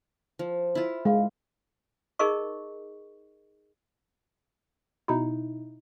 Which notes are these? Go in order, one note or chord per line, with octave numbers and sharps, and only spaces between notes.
F3
E4 F4
G#3 F5
D#4 G#4 A#4 D#5 C#6
B2 D#4 E4